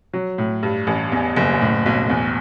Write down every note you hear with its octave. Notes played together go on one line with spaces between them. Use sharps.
F#3
A2
G2
A1
E2
F#1
A2
B1
E2